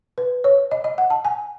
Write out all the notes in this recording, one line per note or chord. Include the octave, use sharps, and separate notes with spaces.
B4
C#5
D#5
D#5
F#5
A5
G#5